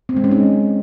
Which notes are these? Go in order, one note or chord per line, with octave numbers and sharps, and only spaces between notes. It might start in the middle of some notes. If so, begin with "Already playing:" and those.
C4
G#3
C#4
D#4